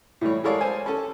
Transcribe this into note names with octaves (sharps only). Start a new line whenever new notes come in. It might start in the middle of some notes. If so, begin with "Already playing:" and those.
A2 E3 G3 A3 C#5
G#3 A4 A#4 C#5 D5 F5
C5 G#5
C#4 A4